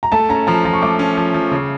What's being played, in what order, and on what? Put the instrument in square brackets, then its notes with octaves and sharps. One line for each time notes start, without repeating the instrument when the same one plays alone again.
[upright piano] A#5
[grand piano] A3 [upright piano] A5
[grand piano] C#4 [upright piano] A#5
[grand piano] F3 [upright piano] A#5
[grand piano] F3 [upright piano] A#5
[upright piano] C#6
[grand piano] A3 [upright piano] D6
[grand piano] C#4
F3
F3
C#3